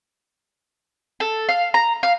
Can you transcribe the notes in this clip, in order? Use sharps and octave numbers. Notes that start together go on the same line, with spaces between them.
A4
F5
A#5
F5